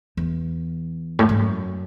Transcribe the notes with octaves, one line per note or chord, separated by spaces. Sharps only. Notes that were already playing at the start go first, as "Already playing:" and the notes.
E2
A2
G#2
F#2